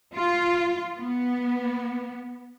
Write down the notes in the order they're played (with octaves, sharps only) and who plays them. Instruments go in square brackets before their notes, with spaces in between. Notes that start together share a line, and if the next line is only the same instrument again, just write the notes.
[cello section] F4
B3